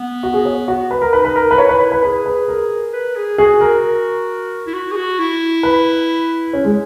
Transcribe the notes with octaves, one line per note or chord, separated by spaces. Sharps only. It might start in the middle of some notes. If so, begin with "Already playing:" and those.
Already playing: B3
F#4
G#4
C#5
F#4
B4
A#4
D#4 B4
B4
A#4
B4
E4 C#5
B4
B4
G#4 B4
B4
A#4
B4
G#4
F#4 G#4
A#4
E4
F#4
G#4
F#4
E4
B4
C#4
G#3